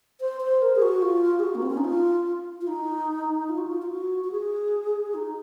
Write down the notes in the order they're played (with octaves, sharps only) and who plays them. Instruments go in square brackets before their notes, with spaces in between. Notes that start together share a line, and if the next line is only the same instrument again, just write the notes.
[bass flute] C5
C5
A#4
G#4
F#4
F4
G#4
F#4
A#3
C4
C#4
D#4
F4
F4
D#4
F4
F#4
F4
F4
F#4
F#4
G#4
D#4